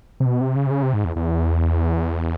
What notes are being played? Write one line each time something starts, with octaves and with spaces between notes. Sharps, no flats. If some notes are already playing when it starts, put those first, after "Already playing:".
C3
B2
C3
C#3
C3
C#3
C3
G#2
E2
E2